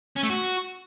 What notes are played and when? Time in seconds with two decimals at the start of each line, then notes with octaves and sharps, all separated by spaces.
0.17 C#4
0.23 A3
0.30 F#4